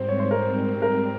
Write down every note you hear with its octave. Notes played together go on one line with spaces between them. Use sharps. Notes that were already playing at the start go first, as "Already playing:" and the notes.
Already playing: G#2 G3 C4 C5
C#5
C5
A#4
A#4